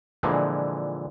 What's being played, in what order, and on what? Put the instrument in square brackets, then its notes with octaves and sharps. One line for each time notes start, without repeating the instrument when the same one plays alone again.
[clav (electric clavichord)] A#2 D3 E3 F3 G#3